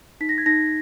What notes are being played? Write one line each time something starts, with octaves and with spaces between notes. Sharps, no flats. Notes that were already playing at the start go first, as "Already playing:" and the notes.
D#4 B6
A#6
G#6
D#4 A#6